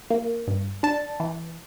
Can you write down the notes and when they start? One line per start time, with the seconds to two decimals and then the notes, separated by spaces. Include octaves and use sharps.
0.10 A#3
0.47 G2
0.83 D4 A5
1.20 E3